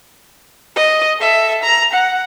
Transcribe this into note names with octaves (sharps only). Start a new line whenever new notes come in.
D#5
A4 E5
A#5
F#5